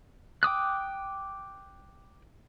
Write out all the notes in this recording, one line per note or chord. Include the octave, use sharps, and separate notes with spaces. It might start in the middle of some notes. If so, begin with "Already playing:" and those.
G5 D6 D#6 F#6